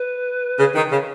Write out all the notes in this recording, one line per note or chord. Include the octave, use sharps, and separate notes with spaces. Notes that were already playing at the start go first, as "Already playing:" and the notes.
Already playing: B4
C#3
D#3
C#3